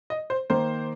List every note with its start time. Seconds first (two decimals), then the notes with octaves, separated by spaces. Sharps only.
0.10 D#5
0.30 C5
0.50 D#3 A#3 C5